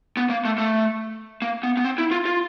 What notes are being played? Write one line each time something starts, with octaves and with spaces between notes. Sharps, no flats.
B3
A#3
A3
A3
A#3
B3
B3
C4
E4
F4
F4